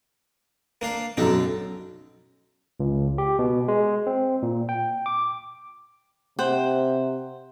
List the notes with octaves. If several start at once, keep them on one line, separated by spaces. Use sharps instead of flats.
A#3 D4 F5
B1 F#2 D4 D#4 A4
C#2
G4
B2
G#3
C4
A#2
G5
D6
C3 C5 F#5 G5